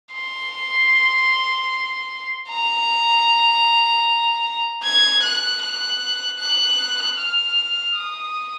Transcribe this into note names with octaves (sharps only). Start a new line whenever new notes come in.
C6
A#5
G#6
F#6
F#6
F#6
F6
D#6